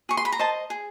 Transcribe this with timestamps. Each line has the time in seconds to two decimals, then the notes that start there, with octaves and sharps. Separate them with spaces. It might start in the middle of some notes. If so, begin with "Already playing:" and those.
0.09 G#4 C#6
0.17 C6
0.25 B5
0.32 A#5
0.39 C5 D#5 A5
0.70 G#4